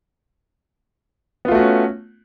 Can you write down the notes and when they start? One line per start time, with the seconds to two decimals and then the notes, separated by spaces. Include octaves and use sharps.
1.45 B3
1.48 F4
1.52 A3
1.55 F#4
1.58 C#4